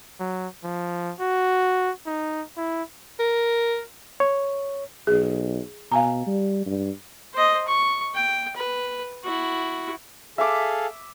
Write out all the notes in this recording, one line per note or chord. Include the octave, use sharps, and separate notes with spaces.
F#3
F3
F#4
D#4
E4
A#4
C#5
B1 G#4
B2 F5 G#5 A#5
G3
G2
C5 D#5
C#6
G5
B4
E4 F#4
G#4 A4 E5 F5 D6